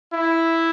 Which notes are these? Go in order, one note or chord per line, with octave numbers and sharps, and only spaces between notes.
E4